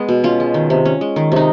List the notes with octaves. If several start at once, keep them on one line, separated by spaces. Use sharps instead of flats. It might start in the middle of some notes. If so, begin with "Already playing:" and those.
Already playing: G#3 B3
B2
C#4 F4
G#3
D#3
C3
C#4
G#3
D#3
C3 D#4